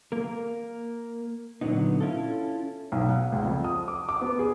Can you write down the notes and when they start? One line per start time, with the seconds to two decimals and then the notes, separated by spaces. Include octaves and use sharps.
0.12 A#3 A#4
1.61 A#2 D3 F#3 G#3 B3 D#4
2.00 C#4 E4 F4 A4
2.92 B1
3.09 F#5
3.32 C#2
3.45 F2
3.64 D#6
3.88 D6
4.09 D6
4.21 B3
4.39 G#4